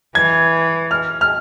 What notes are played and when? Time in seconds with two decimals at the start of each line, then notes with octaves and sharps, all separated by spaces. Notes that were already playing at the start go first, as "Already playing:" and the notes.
0.15 E3 G#6
0.91 F6
1.21 F6